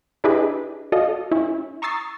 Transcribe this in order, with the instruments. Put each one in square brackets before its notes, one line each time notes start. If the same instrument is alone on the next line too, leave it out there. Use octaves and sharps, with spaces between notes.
[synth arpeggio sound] D4 E4 G4 G#4 B4 D#5
F#4 A4 D5 D#5 F5
C#4 E4
A#5 C#6 D#6 E6 A6 C7